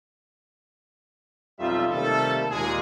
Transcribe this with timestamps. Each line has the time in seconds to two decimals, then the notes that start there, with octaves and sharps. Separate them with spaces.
1.60 B1 F2 G3 D#4 F4 E5
1.91 C3 D#3 G3 A3 A#3 A4
2.51 D#2 A#2 G#3 G#4